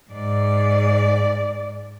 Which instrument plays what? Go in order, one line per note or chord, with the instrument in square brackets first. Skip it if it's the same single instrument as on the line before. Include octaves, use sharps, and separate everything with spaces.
[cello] G#2 D5